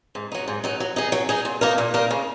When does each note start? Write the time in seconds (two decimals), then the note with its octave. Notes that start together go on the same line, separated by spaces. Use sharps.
0.15 G#2
0.32 F#3 D#4
0.48 G#2
0.64 F#3 D#4
0.80 F#3
0.96 D#4 G#4
1.12 F#3
1.29 D#4 G#4
1.45 A#2
1.61 A#3 D#4 A#4
1.78 A#2
1.94 A#3 D#4 A#4
2.10 C#3